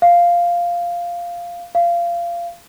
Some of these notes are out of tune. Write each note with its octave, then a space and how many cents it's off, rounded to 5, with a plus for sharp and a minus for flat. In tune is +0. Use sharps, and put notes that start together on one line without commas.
F5 -5
F5 -20